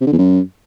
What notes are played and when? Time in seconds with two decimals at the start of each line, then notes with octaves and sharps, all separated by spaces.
0.01 C3
0.07 D3
0.12 E2
0.18 F#2